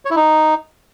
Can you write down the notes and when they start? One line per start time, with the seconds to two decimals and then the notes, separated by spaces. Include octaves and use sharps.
0.05 C#5
0.11 E4
0.16 D#4